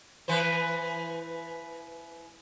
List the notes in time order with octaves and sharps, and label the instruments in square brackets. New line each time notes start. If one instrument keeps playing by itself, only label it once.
[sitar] E3 B4 C5